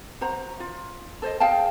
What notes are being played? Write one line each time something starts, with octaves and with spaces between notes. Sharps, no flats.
F#4 C5 F#5 A#5
F4
A4 C5 C#5 D#5
G#4 F5 G5 A5